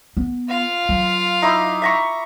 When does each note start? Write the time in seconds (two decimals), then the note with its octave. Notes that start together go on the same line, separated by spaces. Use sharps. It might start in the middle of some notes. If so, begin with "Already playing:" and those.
0.17 B3
0.49 F4 F5
0.89 F#3
1.42 D#4 E4 D6
1.82 E5 A#5 C#6